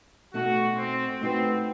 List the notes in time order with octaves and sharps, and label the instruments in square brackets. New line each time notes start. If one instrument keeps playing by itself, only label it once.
[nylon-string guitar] B2 A3 D#4 A4 [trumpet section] F#4
[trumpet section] C4
[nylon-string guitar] A3 D#4 F#4 B4 [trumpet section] C4